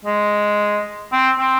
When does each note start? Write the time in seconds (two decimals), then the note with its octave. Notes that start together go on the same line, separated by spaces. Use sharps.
0.05 G#3
1.12 C4
1.39 C4